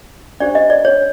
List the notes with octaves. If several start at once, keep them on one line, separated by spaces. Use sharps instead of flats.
D4 G4 C5 D5
D#5
D5
C#5